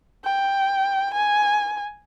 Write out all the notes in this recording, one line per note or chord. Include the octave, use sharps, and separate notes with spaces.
G5
G#5